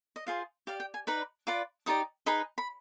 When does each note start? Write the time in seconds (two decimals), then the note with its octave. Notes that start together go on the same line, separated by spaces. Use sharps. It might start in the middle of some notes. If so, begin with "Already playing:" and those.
0.16 D#5
0.27 F4 G#4 C5 F5
0.67 G4 D5 F5
0.80 G5
0.94 G#5
1.07 D#4 B4 D5 B5
1.47 F4 B4 D5 D6
1.86 D#4 G4 D5 D#6
2.26 D#4 G#4 B4 D#5 B5
2.58 B5